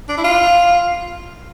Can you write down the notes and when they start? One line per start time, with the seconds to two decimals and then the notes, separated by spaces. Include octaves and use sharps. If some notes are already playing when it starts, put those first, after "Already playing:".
0.09 D4
0.18 E4
0.24 F4